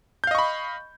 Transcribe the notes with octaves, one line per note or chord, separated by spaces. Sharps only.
D#5 F5 B5 C#6 G6